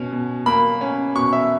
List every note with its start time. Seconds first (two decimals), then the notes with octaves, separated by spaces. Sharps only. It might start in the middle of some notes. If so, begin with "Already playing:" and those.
Already playing: B2 C#4
0.12 B2
0.46 A#3 B5
0.81 C#4
1.15 B2 C#6
1.33 E5